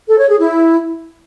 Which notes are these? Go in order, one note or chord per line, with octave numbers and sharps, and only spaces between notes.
A4
C#5
G#4
E4